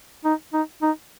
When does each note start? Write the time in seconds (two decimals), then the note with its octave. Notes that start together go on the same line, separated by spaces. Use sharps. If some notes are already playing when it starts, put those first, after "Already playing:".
0.25 D#4
0.53 D#4
0.82 D#4